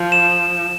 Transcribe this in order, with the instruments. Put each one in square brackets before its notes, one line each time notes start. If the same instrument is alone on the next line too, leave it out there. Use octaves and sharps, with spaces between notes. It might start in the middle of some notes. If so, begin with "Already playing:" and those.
Already playing: [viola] F3
[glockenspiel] E7